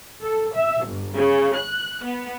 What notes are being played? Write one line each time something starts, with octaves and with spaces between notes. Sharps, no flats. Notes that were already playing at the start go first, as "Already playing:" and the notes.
A4
E5
G1
C#3
F#6
B3